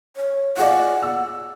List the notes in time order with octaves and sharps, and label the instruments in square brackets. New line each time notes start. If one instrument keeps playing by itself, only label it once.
[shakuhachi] C#5
[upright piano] F4 G#4 D5 [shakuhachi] F#5
[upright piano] E6